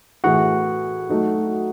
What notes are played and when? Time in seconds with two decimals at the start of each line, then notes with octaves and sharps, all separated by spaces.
0.24 A2 E3 A3 E4 F#4 G#4 F#5
1.09 F#3 A3 D#4